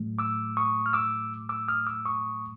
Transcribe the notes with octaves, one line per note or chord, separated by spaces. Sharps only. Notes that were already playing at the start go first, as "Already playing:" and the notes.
Already playing: A2 F#3 A3
D6 E6
C#6 D#6
F6
D6 E6
D6 E6
D#6 F6
D6 E6
C#6 D#6